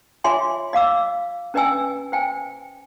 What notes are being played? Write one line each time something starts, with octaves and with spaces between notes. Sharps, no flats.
F4 C#5 E5 G#5 C6 D6
D#5 F5 D6 E6
C#4 B4 D#5 G5 G#5 E6
C5 G5 G#5